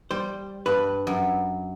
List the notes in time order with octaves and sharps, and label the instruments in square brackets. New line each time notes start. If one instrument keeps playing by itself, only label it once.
[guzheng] G3 [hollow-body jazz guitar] C5
[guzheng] G2 [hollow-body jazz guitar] B4
[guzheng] F#2